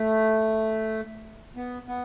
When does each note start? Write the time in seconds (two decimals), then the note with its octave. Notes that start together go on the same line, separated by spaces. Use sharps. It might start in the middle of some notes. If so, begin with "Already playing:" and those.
Already playing: A3
1.57 B3
1.88 B3